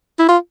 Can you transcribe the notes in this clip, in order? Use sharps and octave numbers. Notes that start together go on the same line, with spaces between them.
E4
F4